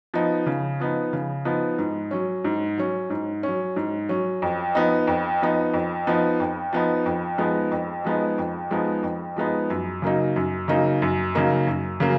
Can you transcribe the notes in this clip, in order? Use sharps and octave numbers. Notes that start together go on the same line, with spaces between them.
F3 B3 D#4
C#3
F3 B3 D#4
C#3
F3 B3 D#4
G#2
F#3 C#4
G#2
F#3 C#4
G#2
F#3 C#4
G#2
F#3 C#4
F2
F3 B3 D#4
F2
F3 B3 D#4
F2
F3 B3 D#4
F2
F3 B3 D#4
F2
F3 G#3 B3 D#4
F2
F3 G#3 B3 D#4
F2
F3 G#3 B3 D#4
F2
F3 G#3 B3 D#4
F#2
C#3 F#3 A#3 D#4
F#2
C#3 F#3 A#3 D#4
F#2
C#3 F#3 A#3 D#4
F#2
C#3 F#3 A#3